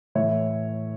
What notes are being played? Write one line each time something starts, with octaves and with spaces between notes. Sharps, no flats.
A2 E3 C#5 E5